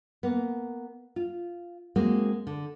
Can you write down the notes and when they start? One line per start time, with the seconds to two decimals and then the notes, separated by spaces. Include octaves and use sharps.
0.23 A#3 B3
1.16 F4
1.96 G#3 A#3 C4 F#4
2.47 D3